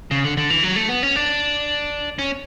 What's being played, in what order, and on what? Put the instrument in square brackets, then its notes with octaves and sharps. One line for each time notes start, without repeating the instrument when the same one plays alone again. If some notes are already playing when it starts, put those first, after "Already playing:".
[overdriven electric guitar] C#3
D3
D3
E3
F#3
A3
B3
C#4
D4
C#4